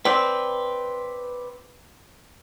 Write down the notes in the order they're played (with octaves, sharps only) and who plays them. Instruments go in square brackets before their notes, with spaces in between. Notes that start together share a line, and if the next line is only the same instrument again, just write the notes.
[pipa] C4 [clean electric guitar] B4 D5